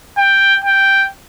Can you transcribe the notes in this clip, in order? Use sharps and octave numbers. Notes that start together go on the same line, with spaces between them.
G5
G5